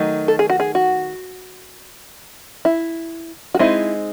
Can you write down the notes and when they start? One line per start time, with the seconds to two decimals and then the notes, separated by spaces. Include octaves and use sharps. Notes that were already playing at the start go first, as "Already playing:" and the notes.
Already playing: D#3 F#3 A3 D#4
0.28 A4
0.39 G#4
0.49 F#4
0.60 G#4
0.75 F#4
2.65 E4
3.54 F#4
3.59 G#3 C4 D#4 E4